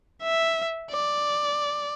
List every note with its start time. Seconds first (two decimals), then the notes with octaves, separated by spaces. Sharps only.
0.23 E5
0.91 D5